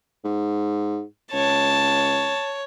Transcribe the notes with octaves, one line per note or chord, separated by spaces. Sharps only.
G#2
C#2 C#5 A5